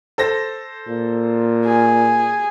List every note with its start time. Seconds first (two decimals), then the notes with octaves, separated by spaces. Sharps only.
0.18 A4 C5 A#6
0.88 A#2
1.65 G#4